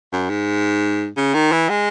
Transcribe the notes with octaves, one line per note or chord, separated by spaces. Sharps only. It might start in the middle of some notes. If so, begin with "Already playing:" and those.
F#2
G#2
C#3
D#3
E3
G#3